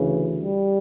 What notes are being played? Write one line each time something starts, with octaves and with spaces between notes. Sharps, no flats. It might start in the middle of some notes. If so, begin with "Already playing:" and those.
Already playing: D2 C#3 E3
G3